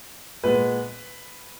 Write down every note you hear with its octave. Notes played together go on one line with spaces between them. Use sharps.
A#2 G#3 B3 B4